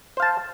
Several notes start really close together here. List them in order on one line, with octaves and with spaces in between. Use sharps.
C5 F5 A5